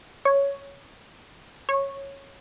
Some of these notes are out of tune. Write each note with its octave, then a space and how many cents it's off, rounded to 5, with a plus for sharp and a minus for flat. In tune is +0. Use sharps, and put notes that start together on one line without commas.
C#5 +5
C#5 -10